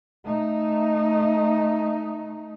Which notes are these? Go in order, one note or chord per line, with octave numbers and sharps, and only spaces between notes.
A3 D#4